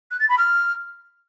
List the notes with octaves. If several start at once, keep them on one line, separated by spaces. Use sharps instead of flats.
F#6
A6
B5
F6